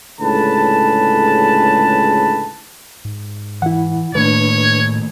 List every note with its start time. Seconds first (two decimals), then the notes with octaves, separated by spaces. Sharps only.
0.20 C#2 A2 D3 G#4 B4 A5
3.05 G#2
3.62 E3 E4 F#5
4.15 A2 D#3 A3 A#3 D4 B4 C#5